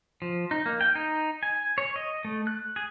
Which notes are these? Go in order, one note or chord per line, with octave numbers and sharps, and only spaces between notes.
F3
D#4
A#3
G5
D#4
G#5
C#5
D#5
A3
F#6
G#4